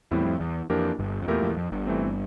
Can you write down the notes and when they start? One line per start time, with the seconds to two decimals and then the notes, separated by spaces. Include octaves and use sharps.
0.11 E2 A2 G3 C4 E4
0.25 F2
0.40 E2
0.70 F2 E3 A#3 D4 G4 A#4
0.99 G1 G2
1.22 F2
1.28 E2 A#2 A3 E4 G4 A#4
1.43 F2
1.49 E2
1.57 F2
1.72 G1 G2
1.87 E3 A3 C4